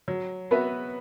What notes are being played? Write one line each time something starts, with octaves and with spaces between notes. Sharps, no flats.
F#3
B3 F#4 B4 E5